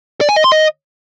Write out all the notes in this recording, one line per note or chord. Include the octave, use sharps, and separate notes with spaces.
D5
G#5
D#5
C6
D#5